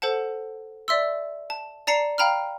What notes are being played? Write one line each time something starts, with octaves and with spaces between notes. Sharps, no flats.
A4 C5 F#5 A5
D5 E5 C6 E6
A5
D5 A5 A#5 C7 C#7
F5 G5 A#5 B5 F6